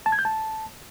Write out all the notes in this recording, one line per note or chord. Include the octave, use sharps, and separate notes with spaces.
A5
G#6
G6
A5